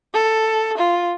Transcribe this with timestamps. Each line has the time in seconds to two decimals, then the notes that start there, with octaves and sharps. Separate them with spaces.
0.14 A4
0.77 F4